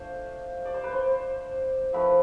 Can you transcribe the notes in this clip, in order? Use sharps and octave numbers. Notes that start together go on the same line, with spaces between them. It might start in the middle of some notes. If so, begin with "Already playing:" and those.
Already playing: A3 D4 F4 C5
D5
C5
B4
C5
F3 A3 C4 E4 B4